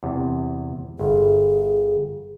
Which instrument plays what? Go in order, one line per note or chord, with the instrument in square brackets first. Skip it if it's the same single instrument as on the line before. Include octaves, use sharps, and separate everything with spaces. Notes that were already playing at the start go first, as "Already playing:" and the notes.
[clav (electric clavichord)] E2 C3
[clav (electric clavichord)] G1 [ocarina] G#4